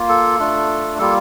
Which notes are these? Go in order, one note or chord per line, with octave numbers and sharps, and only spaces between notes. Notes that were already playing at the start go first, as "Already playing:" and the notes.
Already playing: A#3 F4
A4
A3 D4 F4
G3 A#3 F4 A4